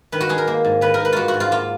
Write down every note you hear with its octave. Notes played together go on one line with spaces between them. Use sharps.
D#3 B4
F#4
D#4 G#4
A#4
A#3
G#2
D#3 B4
A#4
D#4 B4
A#3 F4 F#4
F#4
G#2
F4
A#3 F4